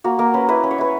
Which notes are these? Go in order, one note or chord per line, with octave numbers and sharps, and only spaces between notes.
A#3 F#4
A#3 A#4
C#4 B4
E4 B4
C#4
C#5
E4 B4